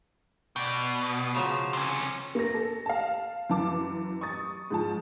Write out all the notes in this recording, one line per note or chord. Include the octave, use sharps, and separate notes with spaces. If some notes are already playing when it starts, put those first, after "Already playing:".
B2 D5 G5
C#3 F3 F#3
C3 C#4
A#3 A#6
A4
F5 A5
F#2 E3 A5 D6
C#6 D#6 A6
G#2 F3 A5